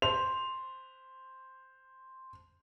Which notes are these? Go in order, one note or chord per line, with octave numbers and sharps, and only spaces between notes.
C5 F7